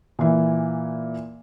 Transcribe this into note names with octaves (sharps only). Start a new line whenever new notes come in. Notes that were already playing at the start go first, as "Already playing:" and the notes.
A#2 E3